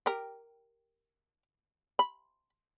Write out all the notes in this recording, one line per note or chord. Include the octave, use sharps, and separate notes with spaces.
G4 A#4
B5